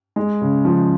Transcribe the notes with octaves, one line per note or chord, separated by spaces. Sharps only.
G#3
C#3
F3